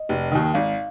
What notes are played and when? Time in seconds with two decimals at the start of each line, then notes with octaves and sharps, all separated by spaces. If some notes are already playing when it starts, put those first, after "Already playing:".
Already playing: D#5
0.09 F1
0.32 D#2 D#3
0.54 G#1 F5